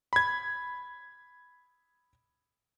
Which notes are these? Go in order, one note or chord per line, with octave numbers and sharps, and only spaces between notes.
B5 G#6